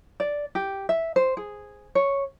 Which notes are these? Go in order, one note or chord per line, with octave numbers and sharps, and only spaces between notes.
D5
G4
E5
C5
G#4
C#5